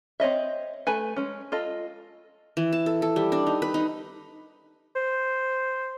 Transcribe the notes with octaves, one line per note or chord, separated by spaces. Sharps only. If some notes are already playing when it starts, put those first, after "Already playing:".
C4 C#5 D#5 E5
A3 B4 G#5
G#3 C#4
F4 A4 D#5
E3
A5
A4
A4
G3
D4
D#4
B4
D#4
C5